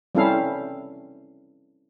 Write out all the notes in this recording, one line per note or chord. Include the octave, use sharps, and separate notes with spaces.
G3 C4 C#4 E4 A4 F5